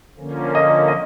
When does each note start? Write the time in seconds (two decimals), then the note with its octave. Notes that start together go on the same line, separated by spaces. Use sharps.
0.17 D3 F3 A#3 C#4
0.55 D#5
0.88 D#5